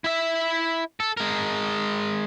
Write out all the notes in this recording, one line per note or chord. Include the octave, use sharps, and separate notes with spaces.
E4 E5
A4
G#3 A#4